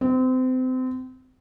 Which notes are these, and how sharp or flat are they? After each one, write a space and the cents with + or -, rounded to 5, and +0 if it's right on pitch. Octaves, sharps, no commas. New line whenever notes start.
C4 -30